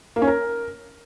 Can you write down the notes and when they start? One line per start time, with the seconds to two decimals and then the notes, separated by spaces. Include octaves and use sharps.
0.16 A#3
0.22 C#4
0.27 A#4